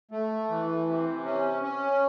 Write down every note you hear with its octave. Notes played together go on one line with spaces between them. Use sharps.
A3
E3
C3
C#4
C#4